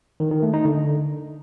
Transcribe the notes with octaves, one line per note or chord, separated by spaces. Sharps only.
D#3
D#3
A3
D#4
D3